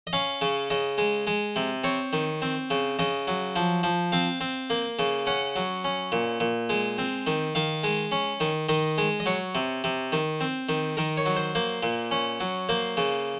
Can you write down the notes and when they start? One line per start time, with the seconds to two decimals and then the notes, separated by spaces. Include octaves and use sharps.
0.07 D#5
0.13 C#4 F5
0.41 C#3
0.70 C#3 D#5
0.98 G#3
1.27 G#3
1.56 C3
1.84 C4 C#5
2.13 D#3
2.42 C4
2.70 C#3
2.99 C#3 D#5
3.28 F#3
3.56 F3
3.83 F3
4.12 C4 F5
4.41 C4
4.70 A#3
4.99 C#3
5.27 C#4 F#5
5.56 F#3
5.84 C#4
6.12 A#2
6.40 A#2
6.69 G#3
6.98 C4
7.27 D#3
7.55 D#3 F5
7.84 G#3
8.12 C#4
8.40 D#3
8.69 D#3 D#5
8.98 G#3
9.20 D#5
9.26 F#3 C#5
9.55 C3
9.84 C3
10.12 D#3
10.41 C4
10.69 D#3
10.97 D#3 A#4
11.17 C#5
11.26 F#3
11.36 C5
11.55 A#3 C5
11.83 A#2
12.11 C#4
12.40 F#3
12.69 A#3 C5
12.97 C#3